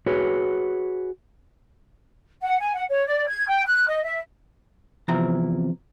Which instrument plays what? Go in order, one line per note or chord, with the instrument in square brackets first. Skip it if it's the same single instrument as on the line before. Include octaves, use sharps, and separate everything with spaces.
[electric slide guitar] F#4 G#4 B4 C#5
[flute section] F#5
G#5
F#5
C#5
D5
G#6
G5
F#6
D#5
E5
[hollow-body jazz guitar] E2 C3 F3 C4 E4 A#5